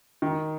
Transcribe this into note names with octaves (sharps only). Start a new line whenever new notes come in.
D#3